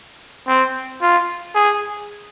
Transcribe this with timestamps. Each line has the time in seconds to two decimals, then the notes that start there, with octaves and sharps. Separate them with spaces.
0.47 C4
1.01 F4
1.55 G#4